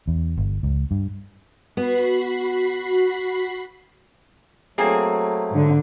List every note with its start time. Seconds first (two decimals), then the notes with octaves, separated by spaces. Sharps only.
0.08 E2
0.37 G1
0.63 C#2
0.91 G2
1.77 B3 F#4 B5 C7
4.78 F#3 A3 A#3 C4 G#4
5.51 G#2 D3